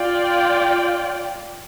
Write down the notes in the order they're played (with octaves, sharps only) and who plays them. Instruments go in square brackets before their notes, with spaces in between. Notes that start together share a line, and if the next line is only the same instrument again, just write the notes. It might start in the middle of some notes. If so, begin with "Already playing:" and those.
Already playing: [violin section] F4 D5 G5